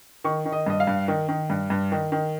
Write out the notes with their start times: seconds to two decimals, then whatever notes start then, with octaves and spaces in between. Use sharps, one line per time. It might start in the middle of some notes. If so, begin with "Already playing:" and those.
0.24 D#3 C#6
0.46 D#3
0.52 D#5
0.66 G2 D#5
0.80 F5
0.87 G2
1.08 D#3
1.29 D#3
1.50 G2
1.70 G2
1.92 D#3
2.12 D#3